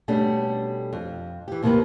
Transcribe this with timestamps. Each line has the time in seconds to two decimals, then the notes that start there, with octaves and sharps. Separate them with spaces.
0.08 B2 G3 A3 C#4 D4
0.93 F2
1.48 E3 G4
1.63 D#2 C3 D#3 A3 A#3 B4